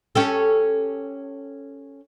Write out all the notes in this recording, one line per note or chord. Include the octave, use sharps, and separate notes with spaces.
C#4 G4 A4